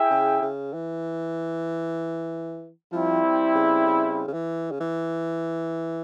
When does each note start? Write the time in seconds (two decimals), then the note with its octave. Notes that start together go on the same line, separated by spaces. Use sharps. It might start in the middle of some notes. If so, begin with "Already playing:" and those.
Already playing: E4 G#4 E5 G5
0.10 C#3
0.42 C#3
0.74 E3
2.92 F3 G3 C4 E4
3.55 C#3
3.86 C#3
4.27 C#3
4.33 E3
4.72 C#3
4.80 E3